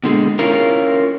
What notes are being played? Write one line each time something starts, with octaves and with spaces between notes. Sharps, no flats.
B2 D3 G#3
C#4 E4 F4 A#4